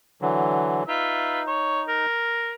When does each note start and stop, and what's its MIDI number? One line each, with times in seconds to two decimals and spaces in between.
0.22 0.83 50
0.22 0.83 52
0.22 0.83 54
0.87 2.06 63
0.87 1.42 65
0.87 1.42 71
0.87 1.42 76
1.47 1.82 73
1.88 2.53 70